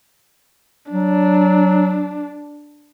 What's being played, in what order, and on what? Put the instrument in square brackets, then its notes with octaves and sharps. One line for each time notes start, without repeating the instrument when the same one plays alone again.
[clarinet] F#3 [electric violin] D4